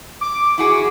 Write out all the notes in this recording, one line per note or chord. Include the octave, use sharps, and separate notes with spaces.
D6
E4 F#4 G#4